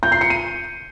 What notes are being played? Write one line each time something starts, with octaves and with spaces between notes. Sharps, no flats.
G6
C7
C#7
D#7